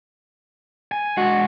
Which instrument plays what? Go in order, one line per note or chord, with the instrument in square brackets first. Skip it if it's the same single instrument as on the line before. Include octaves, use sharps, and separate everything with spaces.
[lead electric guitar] G#5
[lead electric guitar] G#3 D4 [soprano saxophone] F#4